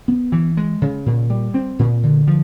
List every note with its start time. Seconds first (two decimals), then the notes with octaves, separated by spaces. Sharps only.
0.08 B3
0.32 E3
0.57 G#3
0.82 C#3
1.06 A#2
1.30 G3
1.54 C4
1.79 A#2
2.03 D3
2.27 F3